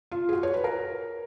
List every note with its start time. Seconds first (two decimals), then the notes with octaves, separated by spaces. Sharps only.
0.11 F4
0.29 G#4
0.33 F#4
0.43 C#5
0.54 B4
0.64 A#4